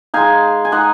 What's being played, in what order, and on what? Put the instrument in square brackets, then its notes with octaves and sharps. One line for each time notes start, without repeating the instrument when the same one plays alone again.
[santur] G#3 D#4 F5 G#5
G#5
G#3 D#4 D#5 F#5